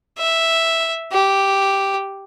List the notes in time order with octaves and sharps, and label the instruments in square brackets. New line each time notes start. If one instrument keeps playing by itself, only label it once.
[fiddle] E5
G4